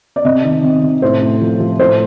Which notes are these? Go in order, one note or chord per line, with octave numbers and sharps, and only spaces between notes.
D5
C3 D#5
D#3
C3
C3
A2 C5
A2
F3
F3
A2 C5